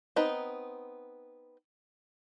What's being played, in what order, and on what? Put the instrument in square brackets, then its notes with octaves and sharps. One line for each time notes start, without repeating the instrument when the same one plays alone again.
[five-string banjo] B3 C4 D#4 B4